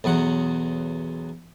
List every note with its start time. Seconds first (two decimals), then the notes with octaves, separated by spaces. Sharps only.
0.04 B1 E2 F#3 F#5